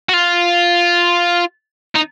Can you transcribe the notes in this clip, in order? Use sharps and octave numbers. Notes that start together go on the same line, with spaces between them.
F#4
F4
D#4